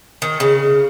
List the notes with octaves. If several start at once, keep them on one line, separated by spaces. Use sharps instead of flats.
D#3
C#3